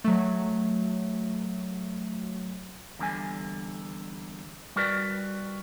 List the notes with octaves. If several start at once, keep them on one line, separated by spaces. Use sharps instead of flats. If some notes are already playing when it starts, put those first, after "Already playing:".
F#3 A3
E2 D3 G3 G#5
G3 F#4 A#4 B4 D5